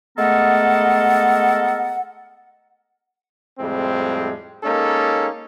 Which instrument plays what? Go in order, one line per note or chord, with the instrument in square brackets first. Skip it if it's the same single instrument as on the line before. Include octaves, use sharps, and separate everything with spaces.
[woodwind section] G#3 A3 B3 A4 A#4 F#5
[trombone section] F2 A2 G3 G#3 C4
G#3 A#3 C#4 D#4 A4